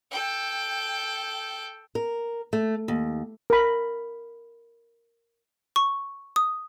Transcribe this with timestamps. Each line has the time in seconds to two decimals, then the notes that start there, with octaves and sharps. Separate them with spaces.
0.11 A4 G5
1.95 A#4
2.53 A3
2.88 D#2
3.50 A#4 B5
5.76 C#6
6.36 D#6